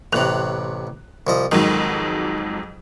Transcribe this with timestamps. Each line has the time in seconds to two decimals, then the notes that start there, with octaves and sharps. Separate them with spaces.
0.13 A1 A2 C3 F#6 F7
1.27 C2 F3 D#5
1.51 F2 G#2 D#3 F#3